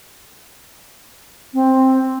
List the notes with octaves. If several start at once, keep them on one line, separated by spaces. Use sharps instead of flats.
C4